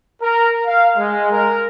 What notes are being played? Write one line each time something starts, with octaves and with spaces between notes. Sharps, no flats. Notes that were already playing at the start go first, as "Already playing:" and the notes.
A#4
F5
G#3
A#4